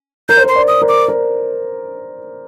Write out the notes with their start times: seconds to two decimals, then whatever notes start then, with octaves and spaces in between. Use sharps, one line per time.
0.29 A#4 G6
0.37 C5
0.44 A#4
0.48 C6
0.55 D5
0.68 D#6
0.82 A#4
0.89 D6
1.08 A#4